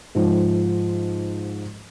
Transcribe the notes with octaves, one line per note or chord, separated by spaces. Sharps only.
G#2 F3